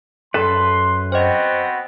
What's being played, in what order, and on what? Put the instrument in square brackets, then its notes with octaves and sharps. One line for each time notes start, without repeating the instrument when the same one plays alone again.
[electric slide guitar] F#2 C3 B4 [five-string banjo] A4 [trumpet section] C6
[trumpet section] B3 C4 F#4 [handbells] C5 D#5